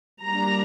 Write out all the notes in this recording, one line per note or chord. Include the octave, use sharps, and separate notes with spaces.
G3 A#3 D4 A#5